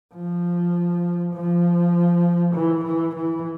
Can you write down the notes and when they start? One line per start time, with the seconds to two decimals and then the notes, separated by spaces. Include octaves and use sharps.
0.14 F3
1.34 F3
2.54 E3
2.85 E3
3.16 E3